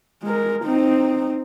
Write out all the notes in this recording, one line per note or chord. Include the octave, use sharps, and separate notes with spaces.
G#3 A#4
C4 D#4